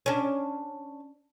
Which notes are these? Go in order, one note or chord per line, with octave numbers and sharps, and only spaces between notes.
C#4 D4